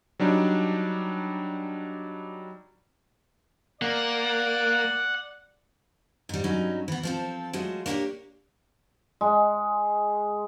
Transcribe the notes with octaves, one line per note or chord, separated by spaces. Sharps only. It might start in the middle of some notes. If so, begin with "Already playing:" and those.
F#3 G3 D4 D#4
A#3 D5 F#5
G#2 G3
G2 F#3 C#4 D#4
E3 B3
F3 C4 A4
F#3 G#3 A3 F4
A#3 D4 E4 F#4 G4 C#5
G#3